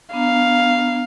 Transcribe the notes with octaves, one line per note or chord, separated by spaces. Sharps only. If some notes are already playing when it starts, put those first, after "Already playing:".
B3 D4 F5 A#5